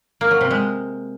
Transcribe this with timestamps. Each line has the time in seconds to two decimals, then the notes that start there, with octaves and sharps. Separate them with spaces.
0.21 A#3
0.31 F#3
0.41 C3
0.51 G#3